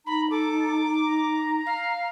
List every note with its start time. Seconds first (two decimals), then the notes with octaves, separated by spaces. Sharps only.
0.06 D#4 A#5 B5
0.30 A4 D6
1.03 A#5
1.65 F5